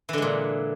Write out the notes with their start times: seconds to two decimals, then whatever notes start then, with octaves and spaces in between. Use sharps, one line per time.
0.09 E3
0.13 D3
0.18 G#3
0.22 A#2